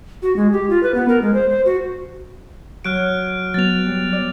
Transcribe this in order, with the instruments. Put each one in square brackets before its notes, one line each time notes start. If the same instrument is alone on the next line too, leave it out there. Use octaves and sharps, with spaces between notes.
[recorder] F#4
G#3
G4
F4
B4
B3
A#4
G#3
C5
C5
F#4
[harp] F#3 [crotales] F6 F#6 D7
[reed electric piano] F#3 B3 [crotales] A6 F7
[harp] G3
D5